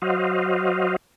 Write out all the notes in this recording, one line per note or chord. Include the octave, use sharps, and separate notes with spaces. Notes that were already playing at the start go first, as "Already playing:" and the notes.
F#3 F#4 C5 D#5 F5